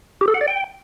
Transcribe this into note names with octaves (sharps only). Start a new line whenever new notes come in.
G4
A4
F#5
D5
G5